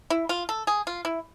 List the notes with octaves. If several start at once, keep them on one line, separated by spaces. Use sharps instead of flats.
E4
F4
A4
G#4
F4
E4